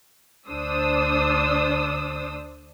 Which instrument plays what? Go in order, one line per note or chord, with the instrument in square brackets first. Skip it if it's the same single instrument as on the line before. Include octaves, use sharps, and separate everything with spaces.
[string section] D2 D4 C5 D#6 E6